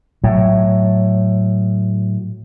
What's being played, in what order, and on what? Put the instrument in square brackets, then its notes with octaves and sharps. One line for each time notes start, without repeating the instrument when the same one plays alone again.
[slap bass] A2 F#3